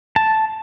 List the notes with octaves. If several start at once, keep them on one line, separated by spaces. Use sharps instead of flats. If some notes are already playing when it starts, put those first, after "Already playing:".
A5